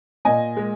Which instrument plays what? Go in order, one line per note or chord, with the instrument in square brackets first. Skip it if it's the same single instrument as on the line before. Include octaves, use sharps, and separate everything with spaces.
[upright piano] A#2 D#5 G#5
G#3